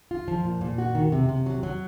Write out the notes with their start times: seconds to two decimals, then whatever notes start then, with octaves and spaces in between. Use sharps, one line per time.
0.11 F4
0.28 F3
0.45 A#2
0.61 A#2
0.78 F#4
0.95 D#3
1.12 C3
1.29 C3
1.46 F#3
1.63 F#3